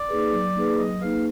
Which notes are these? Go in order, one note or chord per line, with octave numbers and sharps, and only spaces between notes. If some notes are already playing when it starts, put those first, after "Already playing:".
Already playing: D5
A#3 D#4 G#4 B4
F#3
A#3 D#4 G#4 B4
F#3 D#5
A#3 D#4 G#4 B4 F5